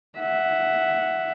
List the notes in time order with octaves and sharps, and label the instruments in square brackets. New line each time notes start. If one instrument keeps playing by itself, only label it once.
[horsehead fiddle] E5 F#5